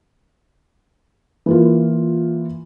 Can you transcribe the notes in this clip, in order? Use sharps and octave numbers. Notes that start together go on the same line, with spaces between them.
E3 A#3 F4